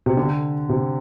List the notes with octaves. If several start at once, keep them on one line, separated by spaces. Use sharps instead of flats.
C3
D3
C3